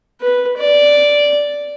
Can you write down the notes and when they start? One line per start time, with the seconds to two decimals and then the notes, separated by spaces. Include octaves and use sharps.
0.21 B4
0.57 D5